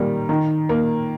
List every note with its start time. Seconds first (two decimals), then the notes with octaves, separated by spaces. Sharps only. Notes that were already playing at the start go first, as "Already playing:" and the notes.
Already playing: D#3 G3 A#3
0.29 D#3
0.69 A#3